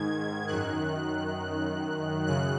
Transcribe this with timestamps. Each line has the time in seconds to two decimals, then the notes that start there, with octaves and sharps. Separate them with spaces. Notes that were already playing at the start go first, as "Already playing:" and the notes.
Already playing: G#2 D#3 G#6
0.48 F#2 D#3 F#6
2.27 F#2 C#3 F#6